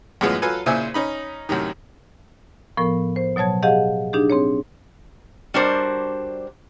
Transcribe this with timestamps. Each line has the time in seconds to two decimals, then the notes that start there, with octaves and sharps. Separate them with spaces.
0.21 F#2 A2 E3 G#3 B3 F4
0.42 F#3 F4 A4 B4 G#5
0.66 A#2 C#3 E4 C5 G#5 E6
0.94 C#4 D#4 B5
1.49 F#2 A2 C3 D#3
2.77 A2 F3 B3 A#4
3.16 C5
3.36 B2 F#3 C#5 A5 G#6
3.63 G4 G#4 D#5 F5 F#5
4.13 D4 D#4 G4 G#4
4.30 C4 G#4 C#5
5.54 G3 D4 F#4 A#4 C5